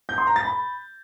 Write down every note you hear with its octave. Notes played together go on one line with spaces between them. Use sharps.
G6
C6
A#5
A6
B5